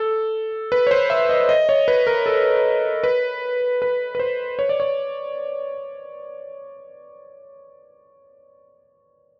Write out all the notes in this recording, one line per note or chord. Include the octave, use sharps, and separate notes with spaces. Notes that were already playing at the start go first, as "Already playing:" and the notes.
Already playing: A4
B4
C#5
C5
E5
D#5
D#5
C#5
B4
A#4
A4
B4
B4
B4
C5
C#5
D5
C#5